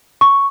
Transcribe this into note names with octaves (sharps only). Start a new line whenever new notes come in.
C#6